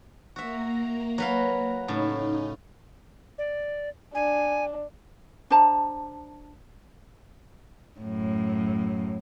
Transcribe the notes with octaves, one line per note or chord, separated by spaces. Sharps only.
A#3 F#4 E5 A#5
F#3 B4 F5
A2 C#3 D#4
D5
D4 G#5
D4 C5 A5 A#5
F#2 A2